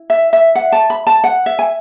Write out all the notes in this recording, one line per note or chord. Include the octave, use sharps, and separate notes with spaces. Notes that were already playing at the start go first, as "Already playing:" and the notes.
Already playing: E4
E5
E5
F#5
A5
B5
A5
F#5
E5
G#5